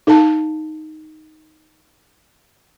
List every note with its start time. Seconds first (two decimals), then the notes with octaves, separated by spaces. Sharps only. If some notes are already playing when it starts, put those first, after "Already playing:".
0.07 D#4 A4 F5 A5